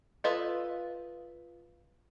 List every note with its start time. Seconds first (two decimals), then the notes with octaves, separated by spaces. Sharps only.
0.24 F4 A4 B4 D#5 E5